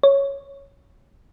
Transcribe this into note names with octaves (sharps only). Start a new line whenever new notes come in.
C#5